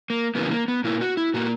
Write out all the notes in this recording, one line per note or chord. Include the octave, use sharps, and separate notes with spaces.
A#3
C#3 E3 G3 A#3 B3
A#3
B3
A#2 A#3 E4
F#4
E4
A#2 A#3 F#4